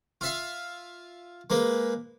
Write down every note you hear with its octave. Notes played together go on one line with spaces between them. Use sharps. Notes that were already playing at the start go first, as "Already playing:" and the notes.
F4 E5 F5
G#3 A#3 B4